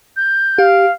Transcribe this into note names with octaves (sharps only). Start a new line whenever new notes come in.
G6
G4 F5